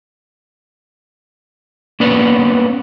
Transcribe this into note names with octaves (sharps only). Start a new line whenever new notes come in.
A#3 B3 C#4 B4 D5